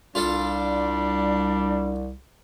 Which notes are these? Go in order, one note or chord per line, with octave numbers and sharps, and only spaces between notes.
C2 G3 D4 F4 A4